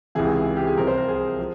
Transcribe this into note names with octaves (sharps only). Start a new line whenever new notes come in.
C#2 C3 E3 G#4
G4
G#4
C2 C3 F3 A#4
C5
A#4
G#4
F3